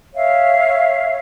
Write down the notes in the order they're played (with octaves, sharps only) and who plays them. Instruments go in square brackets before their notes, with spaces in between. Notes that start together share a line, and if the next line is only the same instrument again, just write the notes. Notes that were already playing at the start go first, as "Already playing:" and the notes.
[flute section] C#5 E5 F5